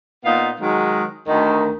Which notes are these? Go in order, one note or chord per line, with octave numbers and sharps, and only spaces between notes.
A#2 B3 D#4 F5
D#3 F#3 G#3
D2 D#3